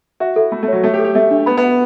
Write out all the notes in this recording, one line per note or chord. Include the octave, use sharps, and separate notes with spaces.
F#4 E5
E4 A4
A3 B5
A3
F#3 C#5
A3 A4
G4
A4
G4
A3 E5
D4
B3 B5
B3
F#5